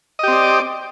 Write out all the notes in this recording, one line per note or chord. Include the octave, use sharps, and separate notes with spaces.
C4 G4 D5 D#5